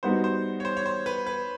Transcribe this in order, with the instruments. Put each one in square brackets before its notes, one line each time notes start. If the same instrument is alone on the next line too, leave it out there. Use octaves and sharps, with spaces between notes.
[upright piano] G3 B3 D#4 F#4 [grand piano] C5
[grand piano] C5
C#5
C5
C#5
C5
B4
B4